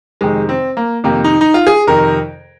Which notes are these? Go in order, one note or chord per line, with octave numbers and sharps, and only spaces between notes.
F2 C3 D#3 G#3
C4
A#3
F2 C3 D#3 A#3
D#4
D#4
F4
G#4
F2 C3 D#3 A#4